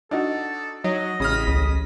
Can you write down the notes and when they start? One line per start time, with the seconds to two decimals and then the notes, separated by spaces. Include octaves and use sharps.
0.11 D4 D#4 F#4 A4
0.84 F#3 D#4 D#5
1.20 A1 C#3 D#6 F6 B6
1.47 C#2 C#3